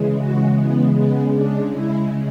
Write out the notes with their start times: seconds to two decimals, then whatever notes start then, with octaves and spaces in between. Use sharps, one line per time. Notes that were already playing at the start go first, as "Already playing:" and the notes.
Already playing: C#3 E3 G#3
0.17 F#4
0.55 B3
0.94 C#3 G#3 B3
1.32 D4
1.70 E4